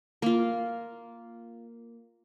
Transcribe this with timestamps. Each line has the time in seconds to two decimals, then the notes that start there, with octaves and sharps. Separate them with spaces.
0.22 A#3 F4